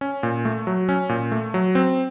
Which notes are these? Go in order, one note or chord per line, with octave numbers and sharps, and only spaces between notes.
C#4
A#2
A3
F#3
C#4
A#2
A3
F#3
C4